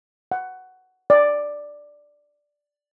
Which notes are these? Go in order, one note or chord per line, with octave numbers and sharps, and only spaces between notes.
F#5
D5